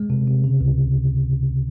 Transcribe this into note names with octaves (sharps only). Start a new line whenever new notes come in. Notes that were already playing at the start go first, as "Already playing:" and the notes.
Already playing: G#3
C3
C3
C#3
C#2